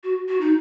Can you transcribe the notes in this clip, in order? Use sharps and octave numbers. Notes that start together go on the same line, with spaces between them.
F#4
F#4
D#4